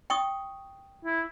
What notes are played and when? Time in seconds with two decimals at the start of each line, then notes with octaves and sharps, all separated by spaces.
0.10 G5 C#6 D#6
1.05 E4